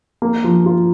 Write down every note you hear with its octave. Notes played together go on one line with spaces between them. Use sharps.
A#3
F3
F4